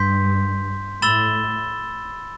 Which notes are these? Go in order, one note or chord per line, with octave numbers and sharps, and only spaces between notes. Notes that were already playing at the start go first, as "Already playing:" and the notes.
Already playing: G2 C6 G6 B6
A2 B5 E6 A6 E7 G7